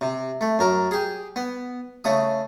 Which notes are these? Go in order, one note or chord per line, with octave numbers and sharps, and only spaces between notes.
C3
A3
F#2 A#4
G4 G#4
B3
C#3 A3 D#6